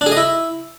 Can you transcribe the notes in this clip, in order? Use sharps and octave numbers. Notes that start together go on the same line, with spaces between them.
D4
G#4
D#5
E4